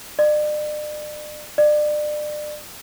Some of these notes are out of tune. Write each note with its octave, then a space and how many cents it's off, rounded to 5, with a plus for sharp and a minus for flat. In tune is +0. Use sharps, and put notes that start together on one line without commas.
D5 +40
D5 +30